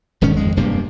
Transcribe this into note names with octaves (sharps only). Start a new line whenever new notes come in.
D#1 G#2 D#3 C#4
G#1 F2 G#3
E1 G2 C3 A#3